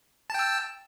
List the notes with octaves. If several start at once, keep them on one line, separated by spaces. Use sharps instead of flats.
G5 A5 E6